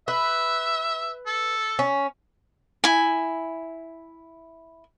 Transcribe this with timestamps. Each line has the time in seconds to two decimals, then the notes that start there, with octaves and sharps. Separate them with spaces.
0.08 B4 E5
1.27 A4
1.79 C#4
2.84 E4 G#5